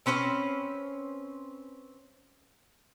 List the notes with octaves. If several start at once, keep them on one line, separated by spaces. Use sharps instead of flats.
C4 C#4 B4 C5